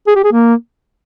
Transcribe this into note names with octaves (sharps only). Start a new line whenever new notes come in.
G#4
G4
G#4
A#3